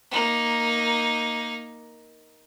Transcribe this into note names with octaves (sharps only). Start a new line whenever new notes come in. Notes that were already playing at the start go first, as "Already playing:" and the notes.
A#3 D#4